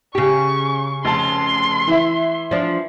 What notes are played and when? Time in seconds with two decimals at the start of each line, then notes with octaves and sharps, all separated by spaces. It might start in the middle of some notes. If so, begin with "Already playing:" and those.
0.15 C#3 G4 C#6
1.05 F1 A5 C6
1.87 E3 E4 E5
2.51 F3 D4